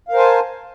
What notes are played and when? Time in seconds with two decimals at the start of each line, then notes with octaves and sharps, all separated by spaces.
0.09 F5
0.11 A#4
0.14 C5
0.17 G#5
0.19 A5